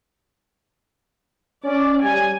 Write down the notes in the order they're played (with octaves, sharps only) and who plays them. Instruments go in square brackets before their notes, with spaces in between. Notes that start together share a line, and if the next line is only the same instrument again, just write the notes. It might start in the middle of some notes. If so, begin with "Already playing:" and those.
[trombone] C#4 [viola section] D5
[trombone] G3 [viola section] G#5